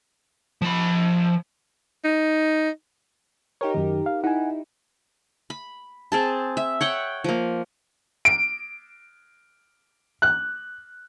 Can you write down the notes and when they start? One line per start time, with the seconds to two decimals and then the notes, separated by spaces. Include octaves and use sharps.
0.62 F3 B5
2.04 D#4
3.61 D#4 G4 A#4 C#5
3.75 F#2 D#3
4.06 F5
4.24 D#4 E4 F#5 G#5
5.50 B5
6.12 C4 G#4 A5
6.57 E5
6.81 C#5 F#5 G5
7.24 F3 A#3
8.25 D7
10.22 F#6